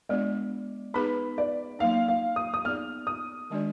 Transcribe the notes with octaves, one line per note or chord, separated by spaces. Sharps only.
G#3 B3 D4 F4 D5
B3 D#4 G#4 B4 B5
D5
F#3 A#3 D#4 F5
F5
D#6
D#6
B3 D#4 G#4 D5 F6
D#6
D#3 G#3 D4 F#4 D5